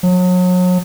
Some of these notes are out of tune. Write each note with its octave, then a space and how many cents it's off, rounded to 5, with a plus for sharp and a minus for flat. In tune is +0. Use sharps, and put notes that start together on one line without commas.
F#3 -35